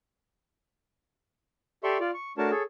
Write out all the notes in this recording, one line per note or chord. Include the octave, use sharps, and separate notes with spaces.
G4 A4 D5 E5 C6 C#6
F4 D5
C#6
A3 D4 F#4 A#4 C#5 A5
G#4 A4 C#5